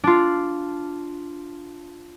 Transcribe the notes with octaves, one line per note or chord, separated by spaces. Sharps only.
D4 F4